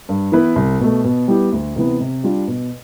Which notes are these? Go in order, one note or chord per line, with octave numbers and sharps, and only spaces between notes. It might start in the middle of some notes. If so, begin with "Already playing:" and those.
G2
E3 B3 E4 B4
C2
B2 A3
B2
G3 B3 E4 G4
D2
C3 E3 B3
C3
G3 D4 F4
B2